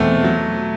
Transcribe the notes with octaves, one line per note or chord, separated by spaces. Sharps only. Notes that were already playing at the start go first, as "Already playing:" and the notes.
Already playing: E2 B2 A3 C4
F#3